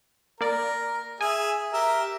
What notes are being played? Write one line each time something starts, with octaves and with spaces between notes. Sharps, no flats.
A#3 A#4 D5
G#4 E5 G#5
G4 A#4 E5